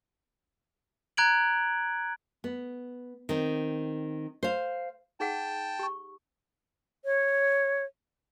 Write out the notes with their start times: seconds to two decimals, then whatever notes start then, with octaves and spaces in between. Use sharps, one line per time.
1.17 A#5 F#6 G#6 D7 F#7
2.44 B3
3.29 D#3 C4
4.43 C5 F5
5.20 D#4 G#4 F#5 G5 A5
5.79 G4 C#6
7.05 C#5